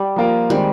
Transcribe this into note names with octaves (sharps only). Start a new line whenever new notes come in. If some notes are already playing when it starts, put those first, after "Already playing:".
Already playing: G3
F3 A#3 F4 A#4
D#3 G3 G#3 C4